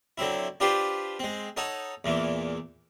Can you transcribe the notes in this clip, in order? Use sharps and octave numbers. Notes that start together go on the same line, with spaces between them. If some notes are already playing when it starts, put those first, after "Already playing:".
D3 F#3 C4 E4
D4 F4 G4 B4 C5
G#3 C4
D#4 A4 C#5 F#5
E2 A#2 E3